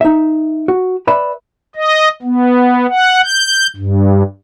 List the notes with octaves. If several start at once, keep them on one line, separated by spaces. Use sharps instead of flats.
D#4 E5
F#4
B4 D5 E5 B5
D#5
B3
F#5
G6
G2